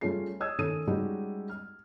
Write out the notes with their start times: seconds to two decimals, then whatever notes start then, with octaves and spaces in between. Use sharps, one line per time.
0.01 G3 A3 C#4 F4 G#4 C7
0.40 C#5 D#5 D#6 E6 G#6
0.58 D#3 A3 C#4 A4 D#6 D#7
0.87 G3 G#3 C#4 D#4 F#4 G4
1.49 F6